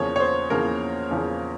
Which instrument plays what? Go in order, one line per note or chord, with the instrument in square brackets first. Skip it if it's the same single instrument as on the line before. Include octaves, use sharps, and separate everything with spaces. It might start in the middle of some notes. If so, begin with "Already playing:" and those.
Already playing: [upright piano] E2 C#3 F3 A#3 C#5
C#5
C5
E2 C#3 F3 A#3 A#4
E2 C#3 F3 A#3